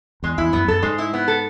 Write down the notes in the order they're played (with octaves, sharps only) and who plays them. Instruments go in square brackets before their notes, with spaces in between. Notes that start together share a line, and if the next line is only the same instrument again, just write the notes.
[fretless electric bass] E2 [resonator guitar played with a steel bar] G#3
[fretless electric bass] E2 [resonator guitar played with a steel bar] E4
[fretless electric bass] F#2 [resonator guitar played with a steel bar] B3
[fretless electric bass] F#2 [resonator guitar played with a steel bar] A4
[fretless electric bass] G#2 [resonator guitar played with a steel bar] G#3
[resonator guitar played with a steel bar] E4
B3
A4